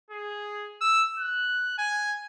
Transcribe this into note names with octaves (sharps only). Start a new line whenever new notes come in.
G#4
E6
F#6
G#5